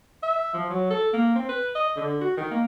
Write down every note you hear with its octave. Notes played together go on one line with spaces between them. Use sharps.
E5
F3
F#3
A4
A#3
C4
B4
D#5
D3
F#4
D#3
A#3